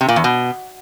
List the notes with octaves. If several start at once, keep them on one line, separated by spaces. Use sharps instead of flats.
C3
A#2
E2
B2